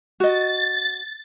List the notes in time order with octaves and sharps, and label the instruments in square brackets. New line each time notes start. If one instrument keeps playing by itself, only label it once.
[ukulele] F#4 D#5 [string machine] A6